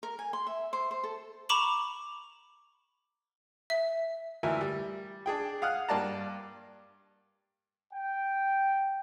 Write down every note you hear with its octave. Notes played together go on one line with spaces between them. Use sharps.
A#4
G#5
C6
E5
C5
C5
A4
A#5 B5 C#6 D6 E7 F#7
E5
D2 E3 A#4 E5 G#5
G3
D4 G#4 G5
F5 F#5 D#6 F6 F#6
G2 A#3 D5 A5 A#5
G5